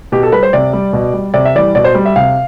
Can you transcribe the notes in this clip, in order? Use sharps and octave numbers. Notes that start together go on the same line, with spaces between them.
B2 G4
A4
G3 B4
C5
C3 D5
G3
B2
G3
C3 D5
E5
E3 G3 D5
B2 D5
C5
G3
E5
C3 F5